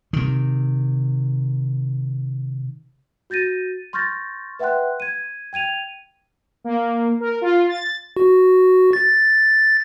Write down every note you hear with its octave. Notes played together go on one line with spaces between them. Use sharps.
C3 D#3
F#4 G6 A6 A#6 D#7
C6 C#6 F6 G6 A6 A#6
B4 E5 F#5 G5 C6 F#6
G#6 D#7
G5 G#6 D#7 F7
A#3
A#4
F4
A6
F#4
A6